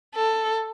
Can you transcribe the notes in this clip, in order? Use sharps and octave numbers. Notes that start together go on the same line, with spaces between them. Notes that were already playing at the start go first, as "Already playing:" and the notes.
A4